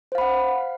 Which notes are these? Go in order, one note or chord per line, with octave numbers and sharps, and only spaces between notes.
C5 F5 F#5 B5